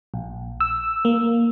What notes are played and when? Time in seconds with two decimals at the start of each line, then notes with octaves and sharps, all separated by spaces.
0.14 A#1
0.60 E6
1.05 A#3